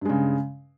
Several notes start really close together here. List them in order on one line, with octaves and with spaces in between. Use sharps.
G2 G#3 C#3